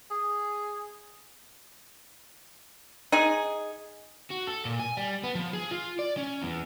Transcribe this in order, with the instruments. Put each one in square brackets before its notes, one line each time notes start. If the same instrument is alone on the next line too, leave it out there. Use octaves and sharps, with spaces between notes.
[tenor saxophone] G#4
[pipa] D#4 G#4
[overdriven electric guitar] F#4
A4
A#2
G#5
G3
B3
F3
G#4
F4
D5
C#4
E2